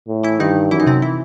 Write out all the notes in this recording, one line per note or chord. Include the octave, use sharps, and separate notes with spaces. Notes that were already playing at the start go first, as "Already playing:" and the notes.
A2
E3 E4
G2 D#3 D#4
F#2 E3 E4
D#4
C3 C4
E3 E4